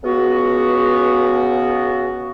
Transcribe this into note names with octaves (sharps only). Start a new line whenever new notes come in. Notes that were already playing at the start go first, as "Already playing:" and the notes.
C#2 B3 F#4